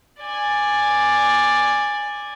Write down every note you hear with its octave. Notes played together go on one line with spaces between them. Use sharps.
D5 G#5